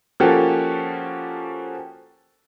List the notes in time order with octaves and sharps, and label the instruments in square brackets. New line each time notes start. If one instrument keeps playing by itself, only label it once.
[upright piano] F3 A#3 C#4 F#4 G4 A4